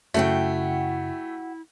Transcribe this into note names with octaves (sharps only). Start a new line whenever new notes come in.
F#2 C#3 A3 E4 F#4 F#5 G5